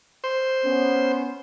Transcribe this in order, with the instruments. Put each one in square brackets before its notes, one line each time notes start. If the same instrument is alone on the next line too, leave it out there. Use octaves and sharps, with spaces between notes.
[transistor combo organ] C5
[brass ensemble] B3 C#4